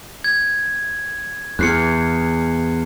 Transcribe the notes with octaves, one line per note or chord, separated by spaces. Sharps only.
G#6
E2 F#6 C7 C#7